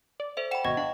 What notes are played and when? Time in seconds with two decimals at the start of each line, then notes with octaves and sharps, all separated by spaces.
0.20 D5
0.37 A4 C5 E5
0.51 F#5 G5 B5 E7
0.64 G#1 B2 F#4 D#5 C#6 G#6
0.77 D4 F5